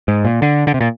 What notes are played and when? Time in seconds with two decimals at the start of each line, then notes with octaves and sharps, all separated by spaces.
0.08 G#2
0.25 A#2
0.42 D3
0.67 D3
0.74 C3
0.81 A#2